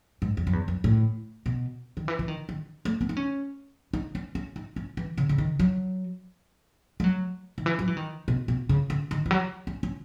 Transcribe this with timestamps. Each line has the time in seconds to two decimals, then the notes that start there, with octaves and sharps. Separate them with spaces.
0.22 G#2
0.37 E2
0.47 F#2
0.53 E2
0.68 F#2
0.84 A2
1.46 B2
1.97 D#3
2.08 E3
2.19 E3
2.28 D#3
2.49 D#3
2.85 A3
3.01 B3
3.09 D#4
3.17 C#4
3.93 D#4
4.15 C#4
4.35 C#4
4.56 D#4
4.76 C#4
4.97 E3
5.18 C#3
5.29 C#3
5.38 D#3
5.59 F#3
7.00 G#3
7.04 F#3
7.58 D#3
7.66 E3
7.79 F#3
7.87 E3
7.97 D#3
8.28 B2
8.48 B2
8.69 C#3
8.90 C#3
9.11 D#3
9.26 E3
9.31 F#3
9.67 C#4
9.83 C#4